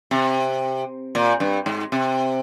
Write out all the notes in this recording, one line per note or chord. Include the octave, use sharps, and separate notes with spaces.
C3
A#2
G2
G#2
C3